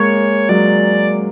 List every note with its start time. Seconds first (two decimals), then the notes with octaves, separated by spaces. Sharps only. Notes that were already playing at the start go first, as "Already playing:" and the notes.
Already playing: G#3 A#3 C#5
0.49 F#3 G#3 D5